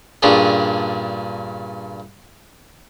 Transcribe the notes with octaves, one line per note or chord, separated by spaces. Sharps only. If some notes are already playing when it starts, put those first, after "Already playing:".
G2 A#2 C#4 D4 G#4